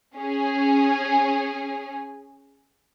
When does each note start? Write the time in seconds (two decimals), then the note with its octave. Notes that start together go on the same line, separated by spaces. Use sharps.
0.17 C#4 G#4